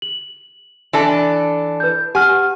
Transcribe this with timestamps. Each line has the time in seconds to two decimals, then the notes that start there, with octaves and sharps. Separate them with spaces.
0.02 F#7
0.93 E3 D4 A4
1.80 B4 G6
2.15 G4 F#5 G#5 F6